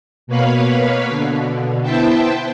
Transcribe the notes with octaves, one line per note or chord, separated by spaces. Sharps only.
B2 A#3 B4 C#5 F5 B5
B2 D3
B3 E4 C5 E5 G5 A5